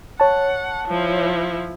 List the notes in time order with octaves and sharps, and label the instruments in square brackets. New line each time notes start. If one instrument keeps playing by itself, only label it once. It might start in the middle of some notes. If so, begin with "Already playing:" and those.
[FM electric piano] C#5 A5 [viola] F#5
[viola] F3 E4